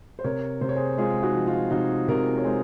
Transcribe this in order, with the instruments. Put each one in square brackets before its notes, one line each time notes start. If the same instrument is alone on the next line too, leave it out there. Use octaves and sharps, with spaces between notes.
[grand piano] C5
C3 A#4 C#5
C3 C5
C#5
G#4 C5
G#3 F4 G#4
D#4 F#4
F3
F4
C3 D#4 F#4
C3 F#4 A#4
C#5
G#3 G#4 C5